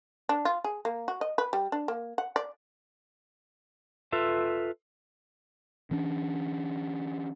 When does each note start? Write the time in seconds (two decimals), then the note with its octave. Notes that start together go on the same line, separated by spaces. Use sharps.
0.29 D4
0.45 F4
0.64 G#4
0.85 A#3
1.08 F#4
1.21 D#5
1.38 B4
1.53 G3
1.72 D4
1.88 A#3
2.18 F#5
2.36 D5
4.13 F4 A4 B4 E5
5.91 E3 C#4 D4